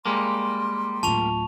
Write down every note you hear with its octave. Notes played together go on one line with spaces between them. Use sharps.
G3 G#3 A#3 C6
D1 F4 A5 C#6 F7